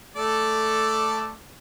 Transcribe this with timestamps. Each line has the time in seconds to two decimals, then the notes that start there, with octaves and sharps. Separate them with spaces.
0.16 A3 A4 D5